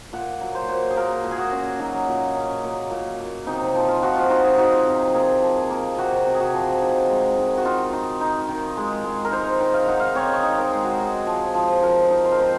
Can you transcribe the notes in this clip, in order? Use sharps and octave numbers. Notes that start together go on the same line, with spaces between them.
A#2 F#5
F#3
C5
A#2
G#4
A#2 A#4
A#2
G#4
F#4
C#4
F#3 D#4
A#2
C#4
A#2
A#2
A#2
C3 D#4
F3
F4
F3 F#4
F4
D#4 F#4
G#4
D#4 F#4
F4
C3
A#3 G#4
F3
A#3
C3 F#4
C3
G#4
F#4
F3
D#4
G#3
D#3
F#4
D#4 F4
D#4
D#4
D#3
G#3
G#3
A#4
D#4 C5
D#3
F5
D#4 F#5
F5
C4 C#5
D#5
C#5
D#4
A#4
G#3 G#4
F#4
G#3 G#4
F3
F3
F3 A#4
D#4
C5
A#4
C4 C5